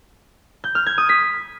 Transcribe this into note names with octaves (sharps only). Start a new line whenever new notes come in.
G6
F6
G#6
D#6
B6